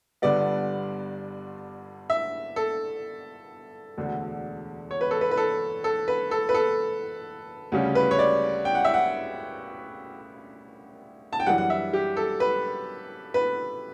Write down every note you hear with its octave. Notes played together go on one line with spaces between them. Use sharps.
G1 G2 D3 G3 B3 D5
E5
A4
E1 D2 D3
C#5
B4
A4
B4
B4
A4
A4
B4
A4
B4
A4
D2 C#3 G3 C#4
B4
C#5
D5
G5
F#5
E5
F#5
A5
G5
F#2 E3 G3 F#5
F#5
E5
G4
A4
B4
B4